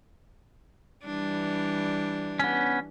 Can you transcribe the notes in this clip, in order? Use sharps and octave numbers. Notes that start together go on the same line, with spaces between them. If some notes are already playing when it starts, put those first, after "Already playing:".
E3 G3 D4
B3 C#4